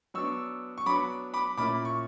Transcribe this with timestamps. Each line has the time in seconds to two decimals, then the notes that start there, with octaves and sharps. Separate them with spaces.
0.14 F#3 B3 D4 C#6 E6
0.78 C#6
0.86 F#3 B3 D4 B5 D6
1.34 B5 D6
1.57 A#2 A#3 C#4 E4 B5 D6
1.85 C#6